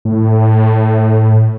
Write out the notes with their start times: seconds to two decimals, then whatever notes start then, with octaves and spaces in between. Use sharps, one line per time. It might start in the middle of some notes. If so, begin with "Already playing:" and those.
0.05 A2